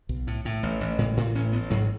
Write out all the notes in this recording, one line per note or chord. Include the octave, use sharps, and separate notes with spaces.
B1
A2
A2
A1
A1
A2 G#3
A2
A1 C#4
A1 B3
G#2 F#3